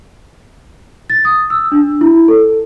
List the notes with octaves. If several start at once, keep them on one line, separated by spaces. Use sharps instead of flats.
A6
D#6
E6
D4
E4
A4